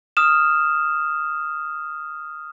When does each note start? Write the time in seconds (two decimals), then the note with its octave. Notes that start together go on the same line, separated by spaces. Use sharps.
0.17 D#6 F6 E7